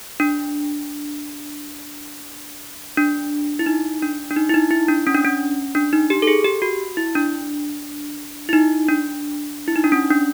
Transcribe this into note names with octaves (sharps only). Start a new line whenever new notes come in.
D4
D4
E4
D#4
D4
D4
D#4
E4
D#4
E4
D4
C#4
D4
C#4
D4
D#4
G4
A4
G#4
G4
F#4
E4
D4
E4
D#4
D4
E4
D#4
D4
C#4
D4